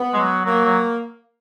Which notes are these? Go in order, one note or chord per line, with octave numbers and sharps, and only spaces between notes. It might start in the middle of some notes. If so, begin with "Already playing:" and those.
Already playing: B3
G#3
F#3
F#3 A#3
F#3